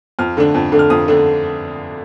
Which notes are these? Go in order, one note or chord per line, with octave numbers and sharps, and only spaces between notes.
F2 F6
D3 A3 D4
F2
D3 A3 D4
F6
F2 D#6
D3 A3 D4